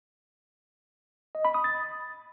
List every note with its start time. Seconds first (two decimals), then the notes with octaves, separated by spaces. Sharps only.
1.35 D#5
1.45 B5
1.54 D#6
1.64 A6